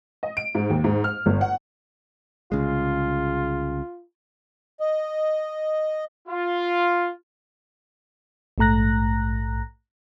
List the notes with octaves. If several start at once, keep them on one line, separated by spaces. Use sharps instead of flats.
D#5
D7
G#2
D#2
G#2
F6
G1
F#5
C2 C#3 G#3 F4
D#5
F4
A#1 G#2 A3 A#5 F#6 A#6